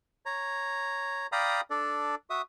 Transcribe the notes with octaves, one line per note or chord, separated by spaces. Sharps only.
C#5 A#5
D5 F5 G5 A#5 B5 D#6
D4 A4 D5
F#4 E5 D#6